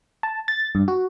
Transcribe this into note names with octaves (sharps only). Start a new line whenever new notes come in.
A5
A6
G2
F#4